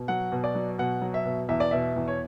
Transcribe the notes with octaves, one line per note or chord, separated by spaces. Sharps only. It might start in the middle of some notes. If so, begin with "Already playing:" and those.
Already playing: B2
F#3 F#5
B2
D5
F#3
B2 F#5
F#3
E5
B2
E2 E5
D5
B2 E5
E2
C#5